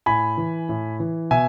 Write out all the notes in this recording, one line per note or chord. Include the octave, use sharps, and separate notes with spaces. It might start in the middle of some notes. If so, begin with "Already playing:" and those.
A2 G#5 B5
E3
A2
E3
B2 E5 G#5